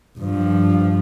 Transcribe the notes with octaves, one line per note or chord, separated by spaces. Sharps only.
G2 F3